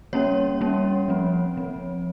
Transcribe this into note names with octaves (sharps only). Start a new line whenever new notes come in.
G3 A#3 C#4 C#5
G3 A#3 C#4
F3 C4
F3 C4